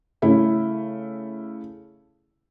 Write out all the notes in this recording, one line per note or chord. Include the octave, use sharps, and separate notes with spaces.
C#3 A3 E4